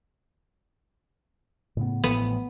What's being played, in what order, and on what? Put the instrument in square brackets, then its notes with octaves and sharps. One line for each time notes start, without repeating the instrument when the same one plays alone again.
[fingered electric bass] A2 C#3 B3
[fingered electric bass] A1 A2 F3 [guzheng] B3